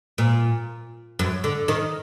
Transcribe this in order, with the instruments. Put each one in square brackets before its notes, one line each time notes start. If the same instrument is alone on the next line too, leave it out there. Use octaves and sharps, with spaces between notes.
[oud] A#2
F#2
D3
D#3